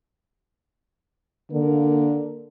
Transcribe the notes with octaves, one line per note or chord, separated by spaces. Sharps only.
D3 A#3 A#4